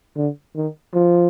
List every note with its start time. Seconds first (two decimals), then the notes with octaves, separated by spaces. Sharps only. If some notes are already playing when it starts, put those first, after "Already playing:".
0.17 D3
0.56 D#3
0.94 F3